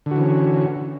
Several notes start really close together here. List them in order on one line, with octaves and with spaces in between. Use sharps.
D3 F#4 E3 C#4